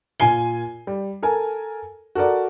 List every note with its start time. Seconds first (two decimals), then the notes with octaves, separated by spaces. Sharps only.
0.20 A#2 F4 G#5 C7 G7
0.87 G3
1.23 A4 A#4 G#5
2.15 F#4 A4 A#4 D5